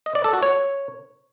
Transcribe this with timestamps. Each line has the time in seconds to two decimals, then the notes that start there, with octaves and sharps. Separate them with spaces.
0.06 D#5
0.15 D5
0.24 A4
0.33 F#4
0.43 C#5